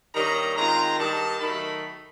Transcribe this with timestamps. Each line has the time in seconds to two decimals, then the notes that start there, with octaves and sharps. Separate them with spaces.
0.14 G2 D#3 G3 A#3 C#4 A#5
0.56 D#3 G#3 C4 F4 A#5
0.98 G2 D#3 G3 A5
1.40 D#3 F#3 A3 B5